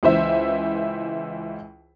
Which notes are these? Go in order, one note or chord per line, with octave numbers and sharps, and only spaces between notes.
C#2 E3 C5 E5